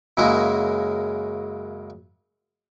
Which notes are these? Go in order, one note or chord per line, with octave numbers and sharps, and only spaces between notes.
F#2 C#3 F#3 G#3 A#3 E4